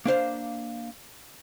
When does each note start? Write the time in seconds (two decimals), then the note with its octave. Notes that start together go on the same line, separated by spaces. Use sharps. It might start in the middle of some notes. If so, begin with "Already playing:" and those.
0.06 A#3 D4 C5 F5